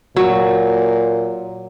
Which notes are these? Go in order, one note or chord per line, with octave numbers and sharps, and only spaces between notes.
A#2 F#3